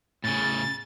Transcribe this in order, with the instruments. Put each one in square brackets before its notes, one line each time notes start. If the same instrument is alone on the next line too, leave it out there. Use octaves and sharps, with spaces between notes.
[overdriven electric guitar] A2 C#3 [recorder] A6